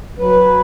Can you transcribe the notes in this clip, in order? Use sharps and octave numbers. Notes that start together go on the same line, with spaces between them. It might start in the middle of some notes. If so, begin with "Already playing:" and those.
F#3 B4